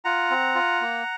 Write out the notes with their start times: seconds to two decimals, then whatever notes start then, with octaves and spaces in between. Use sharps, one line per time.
0.05 F4 F#5 A#5
0.31 C4
0.55 F4
0.81 A#3